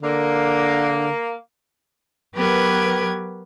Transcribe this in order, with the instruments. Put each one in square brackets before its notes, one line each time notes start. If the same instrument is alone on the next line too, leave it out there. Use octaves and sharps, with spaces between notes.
[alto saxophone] D3 [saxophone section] A#3
[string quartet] F#3 B3 G4 A#4 B4 G#6